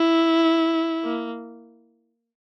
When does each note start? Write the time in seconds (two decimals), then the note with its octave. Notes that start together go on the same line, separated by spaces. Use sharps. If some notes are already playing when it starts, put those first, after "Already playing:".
Already playing: E4
1.04 A#3